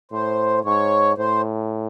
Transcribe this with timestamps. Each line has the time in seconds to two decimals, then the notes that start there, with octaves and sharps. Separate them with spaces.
0.12 A2 C5
0.65 G#2 C#5
1.18 A2 C5